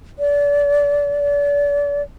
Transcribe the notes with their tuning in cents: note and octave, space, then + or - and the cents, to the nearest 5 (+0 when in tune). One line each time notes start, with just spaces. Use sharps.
D5 -30
D5 -35